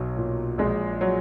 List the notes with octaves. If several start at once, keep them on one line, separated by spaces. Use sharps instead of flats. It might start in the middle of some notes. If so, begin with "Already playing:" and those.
Already playing: B1 F#3
A#2
A#1 G#3
F#3